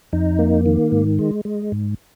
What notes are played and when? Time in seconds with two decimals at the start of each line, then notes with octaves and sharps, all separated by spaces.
0.13 F2 D#4
0.39 A#3
0.66 D#3
0.92 G#2
1.19 G#3
1.45 G#3
1.72 G#2